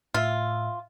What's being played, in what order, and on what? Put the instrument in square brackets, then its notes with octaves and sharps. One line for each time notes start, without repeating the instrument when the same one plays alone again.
[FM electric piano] A2 E5 [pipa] F4